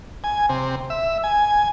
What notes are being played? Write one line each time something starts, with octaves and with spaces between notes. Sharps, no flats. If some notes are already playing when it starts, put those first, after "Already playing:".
G#5
C3
E5
G#5